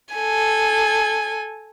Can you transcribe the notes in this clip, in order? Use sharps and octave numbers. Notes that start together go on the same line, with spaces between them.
A4 G#5